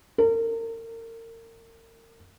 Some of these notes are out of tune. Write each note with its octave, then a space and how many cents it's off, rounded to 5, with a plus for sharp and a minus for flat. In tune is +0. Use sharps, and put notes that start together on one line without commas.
A#4 -35